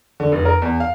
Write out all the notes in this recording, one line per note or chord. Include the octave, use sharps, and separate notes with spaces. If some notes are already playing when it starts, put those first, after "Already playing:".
D3
F1
A#4
E2
F5